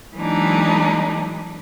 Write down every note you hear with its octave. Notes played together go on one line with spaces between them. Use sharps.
E3 F#3 G#3 A#3 D4 D#4